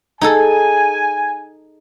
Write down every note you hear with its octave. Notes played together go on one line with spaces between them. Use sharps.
D#4 G#4 A4 G#5